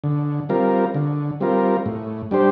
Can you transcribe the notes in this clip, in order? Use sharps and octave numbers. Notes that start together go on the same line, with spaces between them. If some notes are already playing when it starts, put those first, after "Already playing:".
D3
G3 C4 F4 A#4
D3
G3 C4 F4 A#4
A2
G3 D4 G4 C5